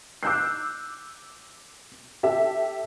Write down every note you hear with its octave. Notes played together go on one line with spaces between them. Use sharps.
D6 E6 F#6 G6 C7
G4 A4 E5